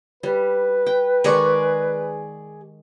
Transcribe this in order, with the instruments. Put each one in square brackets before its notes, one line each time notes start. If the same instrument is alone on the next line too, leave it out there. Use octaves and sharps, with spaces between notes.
[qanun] G3 [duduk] B4
[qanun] G5
[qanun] D#3 G#3 C#6 [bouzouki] G#4 D5